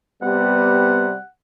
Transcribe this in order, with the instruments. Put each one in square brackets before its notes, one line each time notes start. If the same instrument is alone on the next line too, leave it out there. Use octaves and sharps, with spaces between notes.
[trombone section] C3 G3 [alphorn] B3 [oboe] F#5